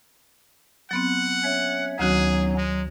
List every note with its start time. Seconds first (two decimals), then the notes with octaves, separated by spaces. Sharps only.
0.91 F#3 B3 C4 F#5
1.44 C#4 C#5 E5
1.99 D2 D#3 F#3 B3 C#4 D#4 F#4 G#4
2.58 G#3